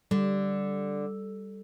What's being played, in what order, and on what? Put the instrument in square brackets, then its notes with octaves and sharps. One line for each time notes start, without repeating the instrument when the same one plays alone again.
[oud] D3 [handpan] G3